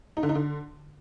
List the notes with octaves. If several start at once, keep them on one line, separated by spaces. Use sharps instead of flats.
D#4
D3
D#4
D3